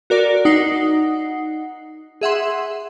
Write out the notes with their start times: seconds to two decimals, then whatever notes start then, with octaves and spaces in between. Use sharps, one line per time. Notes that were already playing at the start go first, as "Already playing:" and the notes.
0.10 F#4 A#4 D5
0.45 D#4 F#5 C7
2.21 G#4 E5 F#5 C6